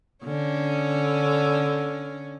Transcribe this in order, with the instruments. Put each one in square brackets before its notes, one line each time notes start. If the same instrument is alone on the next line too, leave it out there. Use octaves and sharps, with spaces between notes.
[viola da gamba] D3 C#4